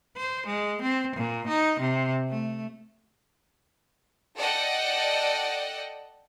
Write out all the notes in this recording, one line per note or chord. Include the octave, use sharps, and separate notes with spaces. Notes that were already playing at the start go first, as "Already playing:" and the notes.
C5
G#3
C4
A#2
D#4
C3
A3
A4 D5 D#5 F#5 G5